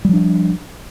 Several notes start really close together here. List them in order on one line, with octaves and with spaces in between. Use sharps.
G3 F3 D4